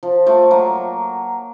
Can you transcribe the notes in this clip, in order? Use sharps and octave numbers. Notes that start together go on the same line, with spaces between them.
F3
F3 A3
F#3 A#3